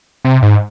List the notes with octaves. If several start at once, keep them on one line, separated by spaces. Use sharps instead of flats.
C3
G#2